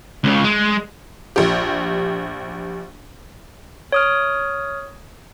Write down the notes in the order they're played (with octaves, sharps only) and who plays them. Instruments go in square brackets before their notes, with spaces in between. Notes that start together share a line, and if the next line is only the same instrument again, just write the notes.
[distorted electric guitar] C#2 C#3
G#3
[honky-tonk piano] A#1 G4
[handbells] C#5 D#6 F6